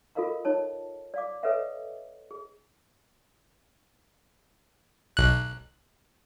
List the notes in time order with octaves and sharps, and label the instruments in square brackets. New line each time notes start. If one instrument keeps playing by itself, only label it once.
[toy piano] F4 A4 A#4 D#5 F5 A#5
D#4 C#5 A5
D5 F5 D6
A4 B4 C#5 D#5 E5 F#5
G#4
[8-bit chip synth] B1 F#6